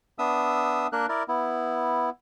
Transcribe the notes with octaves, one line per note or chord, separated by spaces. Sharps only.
B3 D4 E5 D#6 E6
A#3 D4 A#4 F#6
E4 A#4 D5
B3 E4